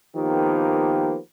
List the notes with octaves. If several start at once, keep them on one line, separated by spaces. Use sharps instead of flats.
D#3 F3 A#3 B3 G4